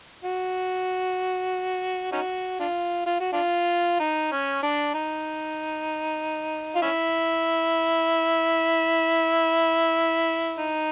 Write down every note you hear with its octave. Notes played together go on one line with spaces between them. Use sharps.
F#4
C#4 D#4 F#4
D4 F4
F4
F#4
D4 F4
D#4
C#4
D4
D#4
F4
C#4 E4
D#4